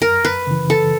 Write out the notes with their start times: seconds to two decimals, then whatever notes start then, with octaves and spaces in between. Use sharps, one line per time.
0.01 F#2 A#4
0.25 B4
0.47 C#3 E3
0.70 A4